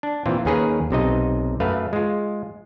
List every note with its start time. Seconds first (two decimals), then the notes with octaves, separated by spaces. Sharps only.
0.03 D4
0.26 A#2 E3 C4 F4
0.45 D#2 D#3 C#4 G#4 A#4 B4
0.91 B1 C3 D#4 D#5
1.60 F#2 A3 B4 F5
1.93 G#3 F4